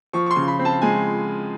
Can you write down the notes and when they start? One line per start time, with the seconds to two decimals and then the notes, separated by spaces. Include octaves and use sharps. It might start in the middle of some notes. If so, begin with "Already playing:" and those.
0.13 F3 C#6
0.26 C#6
0.31 C6
0.36 C#3
0.48 B5
0.59 C4
0.65 A5
0.82 G#3 G#5